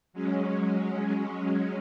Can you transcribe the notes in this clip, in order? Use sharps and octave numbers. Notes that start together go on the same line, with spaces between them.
F#3 G#3 C#4